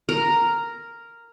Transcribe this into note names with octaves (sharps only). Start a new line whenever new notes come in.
A#4